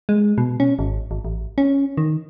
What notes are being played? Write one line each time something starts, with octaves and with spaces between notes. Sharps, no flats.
G#3
B2
C#4
G#1
G#1
A1
C#4
D#3